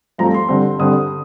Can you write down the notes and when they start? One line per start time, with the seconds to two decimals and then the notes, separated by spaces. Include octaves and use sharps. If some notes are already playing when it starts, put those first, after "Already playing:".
0.18 G2 F3 A3 C4 A#5
0.34 C6
0.48 G2 D3 G3 C4
0.79 G2 D3 G3 C4 D#6